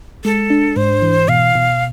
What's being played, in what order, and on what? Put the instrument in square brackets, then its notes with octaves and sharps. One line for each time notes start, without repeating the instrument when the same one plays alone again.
[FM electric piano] G#3 [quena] A4
[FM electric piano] D4
[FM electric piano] G#2 [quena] C5
[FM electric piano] E3
[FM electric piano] B2 [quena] F5
[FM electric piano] B2